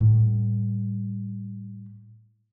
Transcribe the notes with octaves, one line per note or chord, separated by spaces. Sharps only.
A2 G3